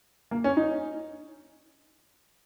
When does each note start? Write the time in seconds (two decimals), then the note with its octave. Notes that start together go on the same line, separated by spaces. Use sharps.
0.31 A#3
0.44 C#4
0.57 D#4